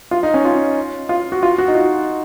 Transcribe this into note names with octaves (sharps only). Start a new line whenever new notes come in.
F4
D#4
C#4
F4
F4
F#4
F4
F#4
D#4
F4